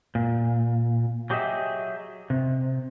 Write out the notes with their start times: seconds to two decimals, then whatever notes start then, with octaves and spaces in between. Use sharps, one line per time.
0.15 A#2
1.30 F#3 G4 G#4 D#5 E5
2.30 C3